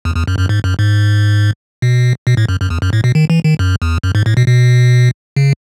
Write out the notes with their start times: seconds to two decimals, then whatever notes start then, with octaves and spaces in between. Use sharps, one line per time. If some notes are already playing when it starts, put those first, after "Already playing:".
0.05 E2
0.16 E2
0.28 F#2
0.39 F#2
0.49 G#2
0.64 F#2
0.79 G#2
1.82 B2
2.27 B2
2.37 A2
2.49 F#2
2.60 F#2
2.70 E2
2.82 F#2
2.93 A2
3.04 B2
3.15 D#3
3.30 E3
3.44 D#3
3.59 F#2
3.82 E2
4.03 F#2
4.15 G#2
4.26 A2
4.37 B2
4.48 B2
5.36 C#3